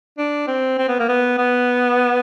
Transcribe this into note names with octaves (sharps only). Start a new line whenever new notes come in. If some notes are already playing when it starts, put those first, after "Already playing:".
D4
C4
C4
B3
A#3
B3
B3